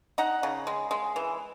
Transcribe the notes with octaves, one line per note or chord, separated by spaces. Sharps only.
D#4 F#5 A#5
C#3
G#3
G#3
E3